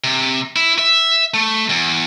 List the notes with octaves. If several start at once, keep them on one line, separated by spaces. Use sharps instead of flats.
C3
E4
E5
A3
E2